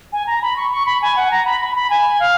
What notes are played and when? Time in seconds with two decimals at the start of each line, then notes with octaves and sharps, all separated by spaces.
0.13 G#5
0.27 A#5
0.42 B5
0.57 C#6
0.71 C#6
0.86 B5
1.02 G#5
1.16 F#5
1.31 A#5
1.45 B5
1.60 B5
1.75 B5
1.90 G#5
2.19 F5